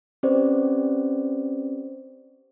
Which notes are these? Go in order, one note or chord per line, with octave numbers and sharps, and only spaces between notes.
C4 C#4 G4 B4 C5 D5